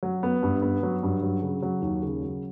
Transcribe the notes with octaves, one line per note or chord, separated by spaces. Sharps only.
F#3
B3
G2
B3
F#3
G2
F#3
C#3
F#3
D#2
C#3
F#3